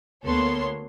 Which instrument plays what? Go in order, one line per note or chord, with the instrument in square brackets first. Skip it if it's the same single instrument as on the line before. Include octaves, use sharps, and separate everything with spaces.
[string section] D2 A#3 B3 A4 C#5 C6